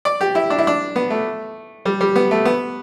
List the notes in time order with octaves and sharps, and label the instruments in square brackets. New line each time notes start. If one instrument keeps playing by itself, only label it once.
[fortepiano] D5
G4
E4
D4
E4
D4
B3
A3
G3
G3
B3
A3
B3